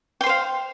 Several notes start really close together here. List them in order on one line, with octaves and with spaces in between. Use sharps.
G5 C6 C5 F5